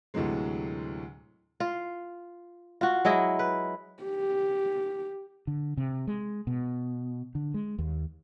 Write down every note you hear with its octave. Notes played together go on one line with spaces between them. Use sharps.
D2 A2 C3 E3 F#3 G#3
F4
F4 F#4
F#3 G#3 E4 D#5
B4
G4
D3
C3
G#3
B2
D3
G#3
D#2